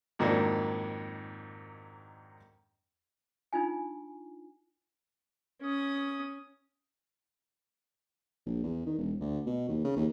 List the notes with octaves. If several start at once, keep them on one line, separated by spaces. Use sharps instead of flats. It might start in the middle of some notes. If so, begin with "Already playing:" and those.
F2 G#2 D#3 F#3 A#3 D4
D4 D#4 F4 G#5
C#4 D#6
A#1
E2
D#3
E1
D2
B2
D#2
C#3
D#2